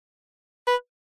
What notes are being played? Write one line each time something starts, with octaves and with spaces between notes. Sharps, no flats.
B4